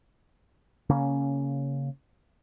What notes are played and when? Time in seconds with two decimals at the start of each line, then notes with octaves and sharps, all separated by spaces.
0.89 C#3 A#3 C#4